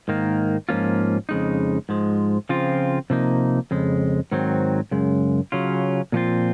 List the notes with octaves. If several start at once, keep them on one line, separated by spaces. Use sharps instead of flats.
G#2 D#3 A#3
G#2 F3 A#3 C#4 F4
F2 C#3 G#3 D#4
G#2 F3 G#3
C#3 F3 C4 F4
C3 F3 A#3 D#4
F2 C#3 G#3
G#2 D#3 F#3 C4
F#2 C#3 G#3
C#3 F#3 C#4 F4
A#2 F3 C4 F4